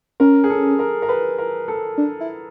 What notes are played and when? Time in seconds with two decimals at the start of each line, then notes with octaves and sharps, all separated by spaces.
0.20 C#4 A#4
0.44 G#4
0.50 A4
0.79 A#4
1.02 A#4
1.09 B4
1.38 A#4
1.68 A4
1.98 D4
2.20 E4